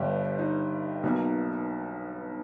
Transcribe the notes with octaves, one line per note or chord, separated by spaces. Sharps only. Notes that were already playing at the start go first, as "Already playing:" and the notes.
Already playing: G1 G2 G3 G4
D#4
B1 B2 A#3